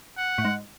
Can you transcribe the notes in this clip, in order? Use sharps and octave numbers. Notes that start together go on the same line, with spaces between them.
F#5
A2
G#2